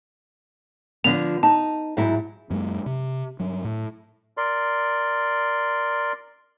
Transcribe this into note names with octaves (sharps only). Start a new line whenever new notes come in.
D3 F3 B3 F7
D#4 A5
G#2 F#3 E4
F#2 F#3 G#3 A#3
C3
G2 F#3
A2
A#4 D5 C6